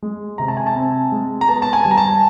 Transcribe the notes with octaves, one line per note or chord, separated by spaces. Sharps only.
G#3
C3 A#5
A5
G#5
A5
C4
G#3
A#5
B3 A5
A5
G#5
G3
A#5
A5